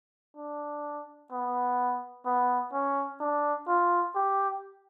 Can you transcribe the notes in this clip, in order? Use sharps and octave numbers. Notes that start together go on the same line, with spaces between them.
D4
B3
B3
C#4
D4
F4
G4